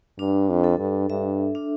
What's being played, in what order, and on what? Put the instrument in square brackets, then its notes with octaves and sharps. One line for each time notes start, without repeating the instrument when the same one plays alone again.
[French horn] G2 [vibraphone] D4
[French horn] F2
[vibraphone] A4
[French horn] G2
[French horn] G2 [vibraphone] E5
[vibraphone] D4